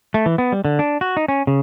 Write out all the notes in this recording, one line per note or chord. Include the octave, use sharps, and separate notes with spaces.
A3
E3
B3
G3
D3
D4
F#4
D#4
C#4
C#3